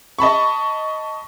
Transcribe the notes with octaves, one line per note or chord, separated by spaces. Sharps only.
D#5 A5 B5 C#6